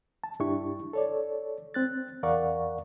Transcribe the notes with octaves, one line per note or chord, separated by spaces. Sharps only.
A5
G2 D4 E4 G4 C#6
A4 C#5 D5
C4 F#6 A6
E2 A#4 D5 F5 F#5 C#6